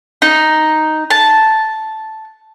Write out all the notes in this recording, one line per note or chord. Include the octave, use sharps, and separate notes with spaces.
D#4
A5